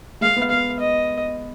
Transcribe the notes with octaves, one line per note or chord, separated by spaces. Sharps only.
G#3 F5
B3
B3 F5
D#5